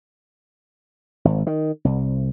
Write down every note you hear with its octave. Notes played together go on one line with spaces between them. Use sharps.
G#1
D#3
C2